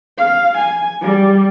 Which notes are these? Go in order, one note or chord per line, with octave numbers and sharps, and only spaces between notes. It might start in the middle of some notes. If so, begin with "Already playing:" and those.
F5
G#5
G3